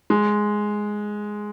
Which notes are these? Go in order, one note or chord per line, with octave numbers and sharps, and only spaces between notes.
G#3